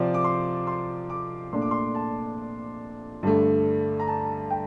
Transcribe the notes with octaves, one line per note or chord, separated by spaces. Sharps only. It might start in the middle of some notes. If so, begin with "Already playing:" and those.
Already playing: C3 F3 C4 D5
D6
C6
C6
D6
A#2 A3 D4 C6
D6
C6
A5
G2 D3 A3
A#5
A5
G5